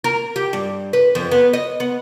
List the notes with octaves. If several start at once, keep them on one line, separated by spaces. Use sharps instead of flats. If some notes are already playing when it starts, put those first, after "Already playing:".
A#4
G4
G2
B4
F2
B3
D#5
B3